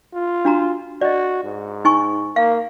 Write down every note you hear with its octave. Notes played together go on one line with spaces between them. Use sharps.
F4
D4 F#4 A#5
F#4 D5 D#5
G#2
D#4 G#5 C#6
A#3 F5